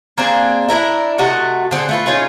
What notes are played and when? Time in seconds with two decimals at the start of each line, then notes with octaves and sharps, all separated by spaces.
0.18 A#3 C4 D4 G#4
0.69 D4 E4 A#4 E5
1.18 C3 A3 F#4 D#5
1.71 D3 C4 G#4
1.89 A3 F4 B4
2.06 C#4 D#4 F4 G#4